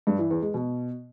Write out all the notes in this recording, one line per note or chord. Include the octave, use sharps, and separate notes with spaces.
G2
E3
E2
G#3
B2